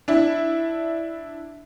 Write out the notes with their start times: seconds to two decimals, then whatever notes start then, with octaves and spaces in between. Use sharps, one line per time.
0.08 D4 E4